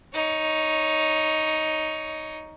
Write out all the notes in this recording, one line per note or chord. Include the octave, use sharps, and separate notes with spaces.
D#4 C#5